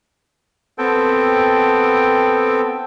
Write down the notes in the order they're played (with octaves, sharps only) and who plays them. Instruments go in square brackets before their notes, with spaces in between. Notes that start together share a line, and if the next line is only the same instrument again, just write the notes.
[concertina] B3 C4 A4 G5